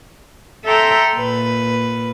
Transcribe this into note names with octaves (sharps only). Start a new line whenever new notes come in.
A4 E5 G5 A#5 C6
A#2 B4